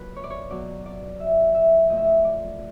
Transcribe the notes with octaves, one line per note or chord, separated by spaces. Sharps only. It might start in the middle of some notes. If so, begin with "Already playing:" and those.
Already playing: A#2 F#3 B4
C#5
D5
C#5
B2 F#3 D5
D5
E5
E5
A2 F3 D#5
E5
D#5
D5